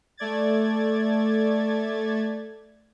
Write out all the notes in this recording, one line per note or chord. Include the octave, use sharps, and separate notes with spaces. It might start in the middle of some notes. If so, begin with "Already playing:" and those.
A3 D5 G#6 A6